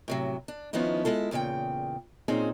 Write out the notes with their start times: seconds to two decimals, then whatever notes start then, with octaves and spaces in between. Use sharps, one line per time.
0.08 A2 C3 F#3
0.48 D4
0.73 D#3 F3 B3 C#4 D#4 E4
1.05 G#3 E4 F4 A4
1.31 E2 A#2 C#3 E5 G5
2.28 A#2 C4 C#4 D#4 G#4